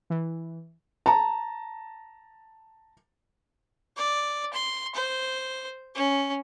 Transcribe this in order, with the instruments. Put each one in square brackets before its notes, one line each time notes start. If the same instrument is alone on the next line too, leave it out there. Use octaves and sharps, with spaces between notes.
[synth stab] E3
[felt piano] A5 A#5
[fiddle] D5
C6
C5
C#4